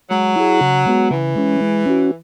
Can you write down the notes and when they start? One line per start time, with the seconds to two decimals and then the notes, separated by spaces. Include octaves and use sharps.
0.11 F#3 G#3
0.36 E4 G#4
0.61 C#3
0.86 G#3 B3 F#4
1.11 C#3 E3
1.36 G#3 C#4
1.61 G#3
1.86 C#4 F#4